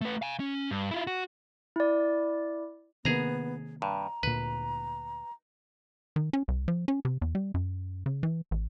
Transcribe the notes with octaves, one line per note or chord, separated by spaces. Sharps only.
A3 B4
F5 G#5
C#4
G2
E4 F4
F#4
E4 D5
C3 D#3 A#3 B3 G#4 A#5
G2 A#5
D2 A#2 B4
D#3
C#4
C2
F3
C#4
C3
E2
G3
F#2
C#3
E3
A1